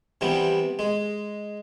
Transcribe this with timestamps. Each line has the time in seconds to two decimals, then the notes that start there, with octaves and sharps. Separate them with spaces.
0.21 C3 E3 G3 B3
0.79 G#3